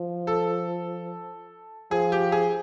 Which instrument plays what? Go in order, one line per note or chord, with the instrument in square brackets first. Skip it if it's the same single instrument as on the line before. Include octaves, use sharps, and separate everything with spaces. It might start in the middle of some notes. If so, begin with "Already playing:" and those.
Already playing: [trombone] F3
[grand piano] A4
[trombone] F3 [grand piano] G#4
[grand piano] G4
G#4